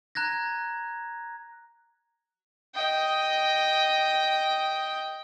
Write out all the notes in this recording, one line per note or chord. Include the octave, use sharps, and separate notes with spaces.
A#5 F#6 G#6 A#6
D#5 G5